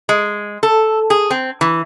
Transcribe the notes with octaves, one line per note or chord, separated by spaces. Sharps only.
G#3
A4
G#4
C4
E3